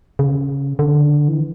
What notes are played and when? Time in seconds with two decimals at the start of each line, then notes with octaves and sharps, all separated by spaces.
0.19 C#3
0.79 D3
1.28 E3